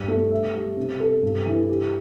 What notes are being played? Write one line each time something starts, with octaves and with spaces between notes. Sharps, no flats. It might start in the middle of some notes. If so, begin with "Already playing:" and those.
Already playing: G2 D4
A3
E5
G3
C3
A4
G2
E3
G4